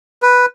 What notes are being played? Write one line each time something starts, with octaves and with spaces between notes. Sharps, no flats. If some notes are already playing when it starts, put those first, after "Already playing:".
B4